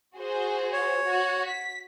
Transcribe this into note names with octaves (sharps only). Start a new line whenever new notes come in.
F#4 G#4 C5
C#5
F#4
B6